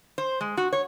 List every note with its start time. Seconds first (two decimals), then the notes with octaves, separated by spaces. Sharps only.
0.18 C5
0.41 G#3
0.57 F#4
0.73 C#5